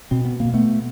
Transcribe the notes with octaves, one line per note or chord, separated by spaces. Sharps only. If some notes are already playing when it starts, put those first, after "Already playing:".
B2 C4
B3
A#3
B2
A3 B3